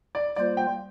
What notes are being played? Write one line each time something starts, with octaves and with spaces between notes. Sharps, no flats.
D5
G3 A#3 F4 C5 D5
G5